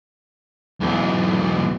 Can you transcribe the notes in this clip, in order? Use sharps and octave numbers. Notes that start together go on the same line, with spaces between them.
B1 E2